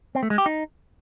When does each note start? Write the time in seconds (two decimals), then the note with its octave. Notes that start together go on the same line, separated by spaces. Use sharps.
0.15 C4
0.23 A3
0.30 G#3
0.38 G4
0.46 D#4